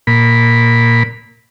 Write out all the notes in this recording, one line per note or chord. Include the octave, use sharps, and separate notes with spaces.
A#2 B5